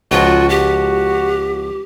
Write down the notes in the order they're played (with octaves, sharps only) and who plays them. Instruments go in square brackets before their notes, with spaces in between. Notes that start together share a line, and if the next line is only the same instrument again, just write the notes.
[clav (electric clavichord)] C#2 F3 [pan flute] F4 [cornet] F#4
[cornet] F#4 [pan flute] G4